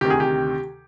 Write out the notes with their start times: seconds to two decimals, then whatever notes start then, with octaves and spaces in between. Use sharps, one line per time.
0.01 D2 C3 D#3 G4
0.10 G#4
0.20 G4